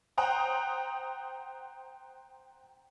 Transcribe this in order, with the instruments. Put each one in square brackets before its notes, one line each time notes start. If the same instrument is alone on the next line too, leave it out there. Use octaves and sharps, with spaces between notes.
[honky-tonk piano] C5 F#5 G5 A#5 D#6